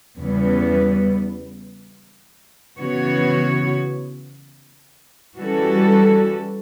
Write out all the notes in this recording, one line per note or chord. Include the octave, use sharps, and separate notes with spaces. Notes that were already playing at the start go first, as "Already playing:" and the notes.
E2 C#3 E3 G3 B3
C#3 E3 B3 F#4 C#5
E3 G3 C#4 F#4 A4